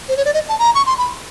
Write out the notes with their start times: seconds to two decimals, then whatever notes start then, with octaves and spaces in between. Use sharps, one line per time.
0.09 C5
0.17 C#5
0.25 D5
0.34 D#5
0.49 A5
0.59 A#5
0.75 C#6
0.86 C6
0.98 B5